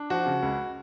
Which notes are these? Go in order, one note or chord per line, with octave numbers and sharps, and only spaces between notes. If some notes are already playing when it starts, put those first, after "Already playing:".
Already playing: D4
F3 F#4
C#3
C#2